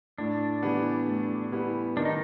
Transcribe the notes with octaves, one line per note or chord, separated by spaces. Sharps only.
A2 D4
E3 G3 B3
A2
E3 G3 B3
D#3 D4
D#4